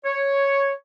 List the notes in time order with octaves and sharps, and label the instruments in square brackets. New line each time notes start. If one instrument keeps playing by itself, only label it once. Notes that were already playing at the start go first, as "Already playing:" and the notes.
[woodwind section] C#5